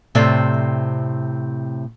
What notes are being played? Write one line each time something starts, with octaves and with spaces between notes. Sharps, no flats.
A2 C3 A3 C4 D5